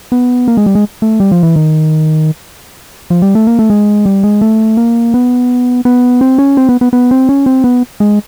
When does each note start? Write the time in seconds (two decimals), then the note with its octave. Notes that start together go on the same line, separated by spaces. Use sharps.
0.12 B3
0.48 A#3
0.57 G#3
0.66 G3
0.75 G#3
1.02 A3
1.20 G3
1.31 F3
1.43 E3
1.56 D#3
3.10 F3
3.22 G3
3.35 A3
3.47 A#3
3.59 A3
3.70 G#3
4.06 G3
4.23 G#3
4.41 A3
4.77 A#3
5.14 B3
5.85 B3
6.21 C4
6.38 C#4
6.57 C4
6.69 B3
6.81 B3
6.93 B3
7.11 C4
7.29 C#4
7.46 C4
7.64 B3
8.00 G#3